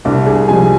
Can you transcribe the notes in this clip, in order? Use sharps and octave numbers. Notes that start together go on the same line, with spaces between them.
C2 D4 D5
G#4 G#5
C3 F3 G#3 G#4 G#5